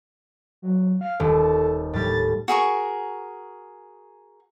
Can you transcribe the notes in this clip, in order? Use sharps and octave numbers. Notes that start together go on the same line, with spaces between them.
F#3
F5
D#1 A4
A2 G3 A6
F#4 G#4 A#4 C#6